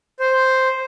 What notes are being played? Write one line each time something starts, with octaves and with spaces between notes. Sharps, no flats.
C5